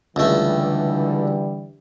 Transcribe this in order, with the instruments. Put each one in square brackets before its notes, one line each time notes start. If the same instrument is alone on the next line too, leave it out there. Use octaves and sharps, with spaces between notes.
[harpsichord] C#2 A3 [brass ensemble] D3 E3 G3